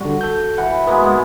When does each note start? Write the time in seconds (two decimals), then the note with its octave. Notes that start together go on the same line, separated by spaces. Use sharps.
0.01 D3 G3 F#4
0.21 A4 G6
0.58 E3 F#5
0.87 G#3 A#3 B3 F#4 B4
1.05 G#2